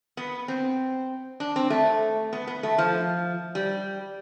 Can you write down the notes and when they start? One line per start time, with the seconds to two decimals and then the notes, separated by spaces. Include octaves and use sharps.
0.17 B3
0.48 C4
1.40 D4
1.56 C4
1.70 A3
2.33 B3
2.47 B3
2.63 A3
2.78 F3
3.55 G3